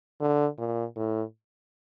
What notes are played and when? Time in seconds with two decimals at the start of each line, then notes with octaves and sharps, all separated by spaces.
0.21 D3
0.59 A#2
0.96 A2